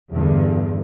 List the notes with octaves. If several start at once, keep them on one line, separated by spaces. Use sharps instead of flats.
E2 G2 D3